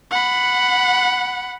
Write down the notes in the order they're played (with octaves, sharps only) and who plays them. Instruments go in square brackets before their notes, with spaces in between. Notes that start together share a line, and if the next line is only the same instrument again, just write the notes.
[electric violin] F#5 B5